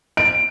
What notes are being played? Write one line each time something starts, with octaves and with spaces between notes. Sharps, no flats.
D7